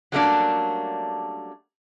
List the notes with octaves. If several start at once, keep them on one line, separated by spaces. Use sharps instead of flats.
F#3 G3 A3 A#3 C#4 D4